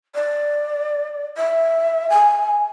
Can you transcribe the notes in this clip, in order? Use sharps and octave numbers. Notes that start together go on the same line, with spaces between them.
D5
E5
G#5